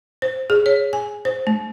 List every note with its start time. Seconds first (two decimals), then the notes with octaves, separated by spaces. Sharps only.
0.22 C5
0.50 G#4
0.66 C#5
0.93 G#5
1.25 C5
1.47 A3